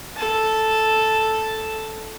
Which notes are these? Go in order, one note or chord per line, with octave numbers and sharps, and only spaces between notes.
A4 A5